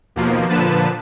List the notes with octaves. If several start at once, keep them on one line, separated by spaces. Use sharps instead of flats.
D#2 B2 F3 A#3
A#2 D3 F3 B4 A5 E7